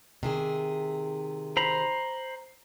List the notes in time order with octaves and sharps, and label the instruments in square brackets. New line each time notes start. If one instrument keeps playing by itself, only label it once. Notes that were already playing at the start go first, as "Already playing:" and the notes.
[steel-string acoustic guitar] C3 D#3 G#4
[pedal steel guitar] C5 A#5 B5